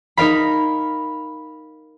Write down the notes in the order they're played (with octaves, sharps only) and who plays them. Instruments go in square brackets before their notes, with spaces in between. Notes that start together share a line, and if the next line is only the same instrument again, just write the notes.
[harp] D#4 A#4 F5 B5